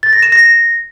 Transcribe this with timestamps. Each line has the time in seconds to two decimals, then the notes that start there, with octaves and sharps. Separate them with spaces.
0.03 A6
0.13 A#6
0.23 E7
0.32 A#6